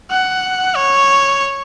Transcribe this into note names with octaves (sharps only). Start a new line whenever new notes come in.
F#5
C#5